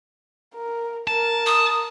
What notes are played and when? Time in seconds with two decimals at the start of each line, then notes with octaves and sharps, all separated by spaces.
0.54 A#4
1.07 A#4 A5
1.46 D#6